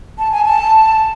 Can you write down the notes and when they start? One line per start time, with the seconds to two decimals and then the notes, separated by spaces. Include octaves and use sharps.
0.19 A5
0.32 G#5
0.45 A5